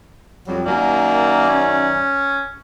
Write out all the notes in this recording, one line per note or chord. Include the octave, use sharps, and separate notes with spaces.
F2 F#3 G3
F#2 D#3 A#3 D5
C#4